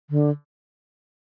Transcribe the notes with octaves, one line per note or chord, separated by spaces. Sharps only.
D3